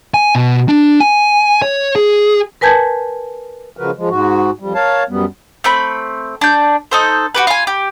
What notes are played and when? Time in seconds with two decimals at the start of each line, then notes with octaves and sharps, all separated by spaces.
0.14 G#5
0.35 B2
0.68 D4
1.00 G#5
1.62 C#5
1.96 G#4
2.61 A#4 B4 G#5 A5 G6 G#6
3.77 C#3 F3 G#3 F#4 A#4 B4
3.97 F3 G#3
4.09 G#2 F#4
4.59 F2 G3
4.75 A#4 C#5 F5 A5
5.09 F#2 G3 B3
5.64 A3 C4 B5
6.41 D4 G6
6.91 D#4 A4 C5
7.35 F#4 G4 B4
7.47 F4 G#5
7.67 G4